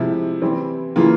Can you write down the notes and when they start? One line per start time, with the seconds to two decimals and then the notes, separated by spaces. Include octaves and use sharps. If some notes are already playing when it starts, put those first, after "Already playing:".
Already playing: C3 F3 G#3 E4
0.41 E3 G3 C4 E4
0.96 C#3 E3 A#3 F4